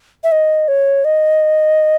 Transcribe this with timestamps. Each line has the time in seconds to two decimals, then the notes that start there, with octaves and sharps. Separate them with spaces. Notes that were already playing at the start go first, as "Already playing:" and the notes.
0.24 E5
0.32 D#5
0.68 C#5
1.05 D#5